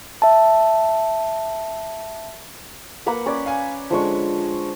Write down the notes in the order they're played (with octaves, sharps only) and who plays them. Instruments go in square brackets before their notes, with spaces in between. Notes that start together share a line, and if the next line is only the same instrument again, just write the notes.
[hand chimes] E5 A5
[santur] A#3 B4 F#5
C#4 B4 D5
[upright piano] F5 G#5
[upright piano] D3 G#3 D4 [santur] F3 C#6